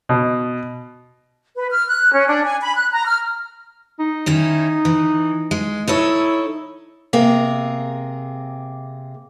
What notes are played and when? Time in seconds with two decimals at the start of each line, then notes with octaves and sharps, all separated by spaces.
0.09 B2
1.57 B4
1.71 F6
1.89 F#6
2.12 C#4
2.28 D4
2.45 G#5
2.62 B5
2.76 F#6
2.92 A#5
3.05 F6
3.99 D#4
4.26 D#3 C#4 E4
4.85 E3
5.51 G#3
5.88 D#4 E4 A4 C#5
7.13 C3 A#3 G#4